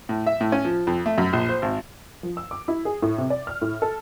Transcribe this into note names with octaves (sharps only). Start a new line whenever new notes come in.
A2
E5
A2
C#4
F3
F2
A3
F#2
A#1
C5
G#1
F3
E6
D6
E4
G#4
A2
C3
D5
F6
A2
A4